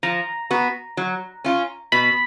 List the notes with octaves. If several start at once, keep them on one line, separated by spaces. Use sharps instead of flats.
F3 A#5
B3 F#4
F#3
C#4 F4
B2 B5